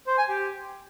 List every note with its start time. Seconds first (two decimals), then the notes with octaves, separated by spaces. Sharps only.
0.07 C5
0.18 G#5
0.29 G4